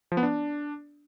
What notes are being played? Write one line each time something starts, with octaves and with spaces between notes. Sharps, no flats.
F3
B3
D4